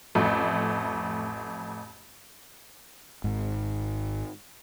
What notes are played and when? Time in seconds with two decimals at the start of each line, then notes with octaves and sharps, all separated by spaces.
0.15 A1 F2 A3
3.24 G#1 G#2